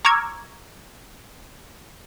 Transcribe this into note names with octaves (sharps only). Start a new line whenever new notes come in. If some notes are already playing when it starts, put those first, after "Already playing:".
A#5 C#6 D6 E6 F6 G#6